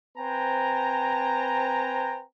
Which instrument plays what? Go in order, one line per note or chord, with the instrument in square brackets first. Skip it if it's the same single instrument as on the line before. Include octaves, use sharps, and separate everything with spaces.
[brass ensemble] C4 B4 C5 G5 G#5 A#5